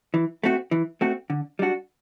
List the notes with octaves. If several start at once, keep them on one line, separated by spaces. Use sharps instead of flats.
E3
A3 C4 F#4
E3
A3 C4 F#4
D3
G3 D4 F#4